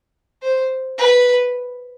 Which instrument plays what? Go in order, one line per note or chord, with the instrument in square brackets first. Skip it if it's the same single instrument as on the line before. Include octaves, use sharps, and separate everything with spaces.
[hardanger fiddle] C5
B4